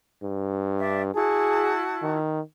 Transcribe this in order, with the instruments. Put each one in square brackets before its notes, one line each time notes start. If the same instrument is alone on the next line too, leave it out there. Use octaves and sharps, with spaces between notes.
[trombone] G2
[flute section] D4 E5
[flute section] E4 F#4 A5 [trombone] G#4
[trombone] D#3